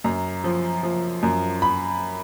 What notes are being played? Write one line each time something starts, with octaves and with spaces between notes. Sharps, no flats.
F#2 A#5
F3
F3
F#2
B5